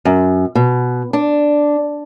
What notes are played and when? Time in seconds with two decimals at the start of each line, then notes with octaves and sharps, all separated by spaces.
0.05 F#2
0.55 B2
1.13 D4